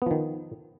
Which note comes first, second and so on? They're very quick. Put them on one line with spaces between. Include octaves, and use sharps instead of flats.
B3 F3 D#3